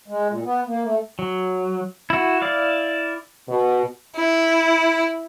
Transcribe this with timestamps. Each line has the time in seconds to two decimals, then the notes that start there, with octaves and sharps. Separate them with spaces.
0.08 G#3
0.29 A#2
0.45 B3
0.67 A#3
0.83 A3
1.19 F#3
2.10 E4 F#4
2.42 E4 D5 F5
3.49 B2
4.16 E4